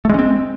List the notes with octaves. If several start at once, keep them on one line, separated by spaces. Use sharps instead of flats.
G#3 A3 C4 C#4